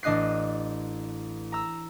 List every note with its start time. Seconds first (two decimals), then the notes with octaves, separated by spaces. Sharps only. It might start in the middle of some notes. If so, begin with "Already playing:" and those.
0.03 A1 D4 D#5 F#6 C7
1.52 A#5 E6